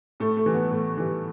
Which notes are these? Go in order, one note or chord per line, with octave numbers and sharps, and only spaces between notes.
A2 A3
A3
E3 G3
B3
A2
E3 G3